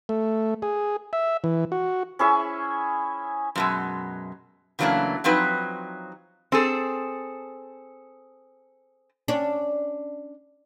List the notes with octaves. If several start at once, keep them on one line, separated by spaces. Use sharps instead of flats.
A3
G#4
E5
E3
F#4
C#4 E4 G#4 E5
F#2 B2 G#3
C#3 E3 F#3 A3 A#3 D4
F3 F#3 C4 D#4 B4
C4 G#4 A4
C#4 D4